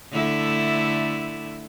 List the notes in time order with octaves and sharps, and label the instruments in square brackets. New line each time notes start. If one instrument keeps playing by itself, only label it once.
[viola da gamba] D3 A3 E4